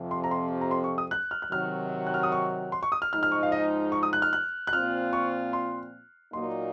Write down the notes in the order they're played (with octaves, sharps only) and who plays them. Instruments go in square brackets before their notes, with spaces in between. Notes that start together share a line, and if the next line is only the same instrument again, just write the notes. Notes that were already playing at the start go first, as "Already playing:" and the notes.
Already playing: [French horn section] F2 C3 F3
[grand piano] C6
A#5
C6
A#5
C6
C#6
D#6
F#6
F6
F#6
[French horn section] C3 D#3 F#3 [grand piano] F6
[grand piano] F#6
F6
D#6
C#6
C6
C#6
D#6
F6
[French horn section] G#2 F3 G#3 D#4 [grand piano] F6
[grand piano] F6
C#6
F5
D#5
C#6
D#6
F#6
F6
F#6
F#6
[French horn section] A#2 F3 C4 F4 [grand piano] F6
[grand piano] C#6
C6
[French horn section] A#2 F#3 A#3 D#4 [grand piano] C6